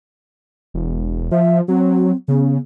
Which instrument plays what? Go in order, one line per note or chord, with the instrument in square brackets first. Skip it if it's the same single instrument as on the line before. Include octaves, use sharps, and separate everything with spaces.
[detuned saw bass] E1
[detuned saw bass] F3 [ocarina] E5
[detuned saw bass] F#3 [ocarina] C4
[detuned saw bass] C#3 [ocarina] B3